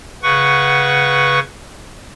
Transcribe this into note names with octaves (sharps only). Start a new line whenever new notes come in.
C#3 B4 F#5 C#6